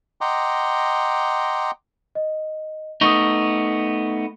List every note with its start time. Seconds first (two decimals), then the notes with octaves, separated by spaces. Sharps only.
0.21 D#5 F#5 G5 A#5 C6 D6
2.15 D#5
3.01 A3 B3 D#4 C#6 D#6